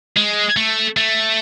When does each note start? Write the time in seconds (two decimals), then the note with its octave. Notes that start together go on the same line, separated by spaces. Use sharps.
0.17 G#3
0.57 A3
0.97 A3